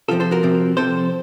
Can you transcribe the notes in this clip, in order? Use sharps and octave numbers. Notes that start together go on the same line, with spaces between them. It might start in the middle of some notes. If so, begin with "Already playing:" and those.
C3 F3 C4 F4 A4
A4 C5
F#4 A#4
C3 F3 C4
C3 F3 C4 A4 C5